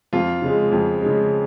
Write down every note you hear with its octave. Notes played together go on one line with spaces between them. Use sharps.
F2 F4
C#3 G#3
F2
C#3 G#3